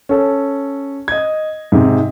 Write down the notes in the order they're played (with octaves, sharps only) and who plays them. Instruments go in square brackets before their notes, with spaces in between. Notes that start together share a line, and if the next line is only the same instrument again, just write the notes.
[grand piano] C#4 A4
D#5 G#6
G#2 C3